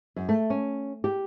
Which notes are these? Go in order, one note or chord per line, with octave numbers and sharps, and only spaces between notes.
F#2
A3
C#4
G4